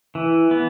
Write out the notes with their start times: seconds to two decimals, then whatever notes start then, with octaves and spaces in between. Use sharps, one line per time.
0.15 E3
0.51 B3